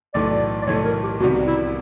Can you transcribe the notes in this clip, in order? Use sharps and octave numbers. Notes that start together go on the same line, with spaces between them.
B1 A2 E3 A3 D5
D5
B1 A2 E3 A3 C#5
A#4
G4
C2 C3 D#3 G3 B3 F#4
E4